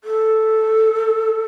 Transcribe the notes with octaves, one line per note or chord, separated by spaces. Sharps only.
A4